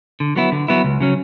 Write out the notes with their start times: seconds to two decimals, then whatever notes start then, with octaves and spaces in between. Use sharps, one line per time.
0.20 D3
0.36 F#3 B3 E4
0.52 D3
0.68 F#3 B3 E4
0.84 C#2
1.00 C#3 F#3 C#4